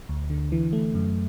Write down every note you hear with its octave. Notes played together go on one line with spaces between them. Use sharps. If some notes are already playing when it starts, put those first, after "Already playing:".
D2
D3
E3
A3
F#2